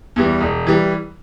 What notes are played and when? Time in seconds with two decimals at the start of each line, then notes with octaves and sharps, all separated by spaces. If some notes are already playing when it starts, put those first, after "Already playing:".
0.16 E2 E3 G3
0.41 E1
0.67 E3 G3